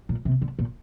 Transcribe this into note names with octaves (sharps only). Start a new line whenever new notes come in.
A#2
C3
D3
A#2